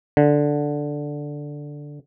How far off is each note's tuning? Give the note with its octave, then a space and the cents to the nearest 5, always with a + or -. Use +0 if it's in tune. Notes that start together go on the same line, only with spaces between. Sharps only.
D3 +0